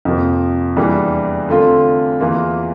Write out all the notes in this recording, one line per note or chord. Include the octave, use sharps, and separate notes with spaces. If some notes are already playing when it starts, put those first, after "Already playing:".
F2 C3 F3 A#3
E2 E3 G3 A#3 D4
D3 A3 C4 F4
E2 E3 A#3 F4